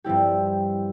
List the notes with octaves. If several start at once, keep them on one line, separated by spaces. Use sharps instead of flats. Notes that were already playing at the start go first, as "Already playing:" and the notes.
G2 F3 C4 E4 G4